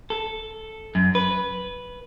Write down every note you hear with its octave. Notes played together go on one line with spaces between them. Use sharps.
A4
F#2
B4